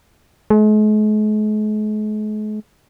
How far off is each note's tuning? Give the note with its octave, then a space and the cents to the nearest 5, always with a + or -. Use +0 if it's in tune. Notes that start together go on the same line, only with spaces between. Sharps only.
G#3 +45